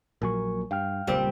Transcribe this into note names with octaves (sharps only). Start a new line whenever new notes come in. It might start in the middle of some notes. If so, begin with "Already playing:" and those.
A#1 A#2 F#3 A#4 G#5 C#6
G2 F5 G5 F6
E1 C#2 A#2 G3 C4